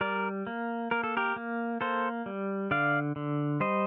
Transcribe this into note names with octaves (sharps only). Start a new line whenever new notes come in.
G3 A#4 D5
A#3
A#3 A#4
A4
G4 A#4
A#3
A#3 A4 C5
G3
D3 D5 F5
D3
G3 C5 D#5